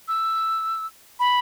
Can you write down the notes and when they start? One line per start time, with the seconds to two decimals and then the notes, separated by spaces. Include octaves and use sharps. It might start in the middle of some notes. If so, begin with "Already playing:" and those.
0.08 E6
1.20 B5